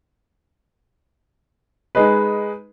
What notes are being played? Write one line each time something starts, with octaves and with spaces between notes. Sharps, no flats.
G#3 D#4 G#4 B4